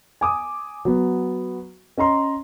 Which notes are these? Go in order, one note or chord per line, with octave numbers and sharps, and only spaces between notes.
G#5 D6 D#6
F#3 B3
C#4 D#5 A#5 C6